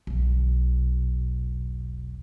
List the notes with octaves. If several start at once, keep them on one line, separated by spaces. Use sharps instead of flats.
E1 B1